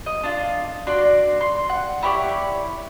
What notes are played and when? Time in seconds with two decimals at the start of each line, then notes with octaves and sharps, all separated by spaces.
0.06 D#5
0.24 D4 F4
0.87 D4 F#4 D5 C6
1.41 C6
1.69 F#5
2.03 E4 G4 C#5 D5